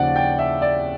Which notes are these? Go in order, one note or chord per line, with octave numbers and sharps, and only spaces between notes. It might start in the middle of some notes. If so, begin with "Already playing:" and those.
Already playing: D#2 C#3 F3 D5 F#5
G5
E5
D5